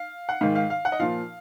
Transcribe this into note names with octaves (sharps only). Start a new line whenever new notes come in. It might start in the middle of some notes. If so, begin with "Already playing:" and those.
Already playing: F5
F#5
G#2 D#3 F5
F5
F5
F#5
D#5
A#2 F3 F5